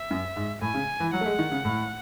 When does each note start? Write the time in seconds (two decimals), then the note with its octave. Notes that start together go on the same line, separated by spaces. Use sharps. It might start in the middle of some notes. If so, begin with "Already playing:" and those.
Already playing: E5
0.11 F#2
0.36 G#2
0.62 A2 G#5
0.74 C#3
1.00 E3
1.13 F#3 F#5
1.21 A3
1.26 G#3
1.39 D#3
1.51 C#3
1.65 A2